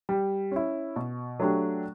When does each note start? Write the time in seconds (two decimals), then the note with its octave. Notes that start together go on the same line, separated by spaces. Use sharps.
0.09 G3
0.51 C#4 E4
0.96 B2
1.39 F#3 A3 D4 G4